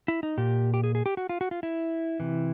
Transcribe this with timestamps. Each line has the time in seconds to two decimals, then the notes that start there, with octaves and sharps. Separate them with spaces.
0.08 E4
0.23 D#4
0.38 A#2 G4
0.74 G4
0.84 G#4
0.95 G#4
1.06 G4
1.17 F#4
1.29 F4
1.41 F#4
1.51 F4
1.63 E4
2.20 C3 E3